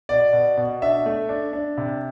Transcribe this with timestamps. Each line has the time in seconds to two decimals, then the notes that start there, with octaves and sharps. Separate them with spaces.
0.09 B2 D5
0.33 B2
0.58 B2
0.82 D4 E5
1.06 A3
1.29 D4
1.53 D4
1.77 C3